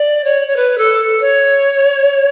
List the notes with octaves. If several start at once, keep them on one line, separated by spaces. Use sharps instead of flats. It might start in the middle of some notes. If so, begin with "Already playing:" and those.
Already playing: D5
C#5
C#5
B4
A4
C#5